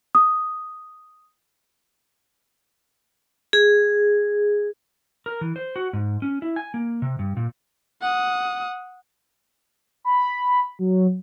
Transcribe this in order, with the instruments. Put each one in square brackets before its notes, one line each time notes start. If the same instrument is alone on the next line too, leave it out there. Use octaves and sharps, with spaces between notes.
[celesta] D#6
[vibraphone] G#4
[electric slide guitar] A#4
E3
C5
F#4
G#2
C#4
E4
G#5
A#3
C3
G2
A#2
[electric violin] F#5 D#6
[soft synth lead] B5
F#3